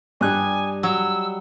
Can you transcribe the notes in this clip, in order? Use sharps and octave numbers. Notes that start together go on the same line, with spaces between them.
G2 G3 D#5 G#5 F#6
F#3 E6